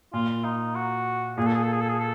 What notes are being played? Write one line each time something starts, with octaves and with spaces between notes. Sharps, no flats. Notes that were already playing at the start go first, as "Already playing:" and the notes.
A#2 F4
D#4
F#4
A#2 G#4
A4
G#4
A4
G#4
A4
G#4
A4